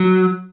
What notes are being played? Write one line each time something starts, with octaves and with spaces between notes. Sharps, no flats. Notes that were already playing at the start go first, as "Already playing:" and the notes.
Already playing: F#3